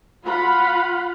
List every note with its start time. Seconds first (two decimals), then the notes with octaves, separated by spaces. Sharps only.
0.25 F4 F5 F#5 B5